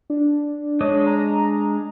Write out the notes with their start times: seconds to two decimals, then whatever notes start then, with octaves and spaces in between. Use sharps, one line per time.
0.10 D4
0.81 G#3 D4 C#5 D#5
1.07 A#5